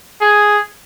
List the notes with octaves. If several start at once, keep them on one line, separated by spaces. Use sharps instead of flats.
G#4